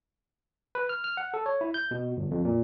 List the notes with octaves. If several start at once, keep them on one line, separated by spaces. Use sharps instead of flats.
B4
F6
F6
F#5
A4
C#5
E4
G6
B2
G1
F2
A#2